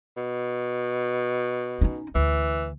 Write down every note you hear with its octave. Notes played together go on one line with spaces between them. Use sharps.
B2
C#4 D#4
D2 E3